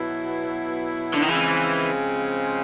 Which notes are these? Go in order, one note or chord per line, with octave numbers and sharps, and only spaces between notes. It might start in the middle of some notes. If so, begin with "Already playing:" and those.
Already playing: B2 F#3 B3 E4
D3
D#3
C#3 E3 F3 G#3 C4